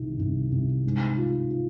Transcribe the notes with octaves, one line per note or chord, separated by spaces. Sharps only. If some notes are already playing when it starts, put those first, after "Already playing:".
Already playing: C2 D#3
C2
C2
G#2
F4
F4